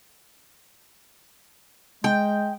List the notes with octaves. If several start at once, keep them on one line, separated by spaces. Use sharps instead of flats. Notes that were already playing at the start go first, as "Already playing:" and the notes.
G#3 G5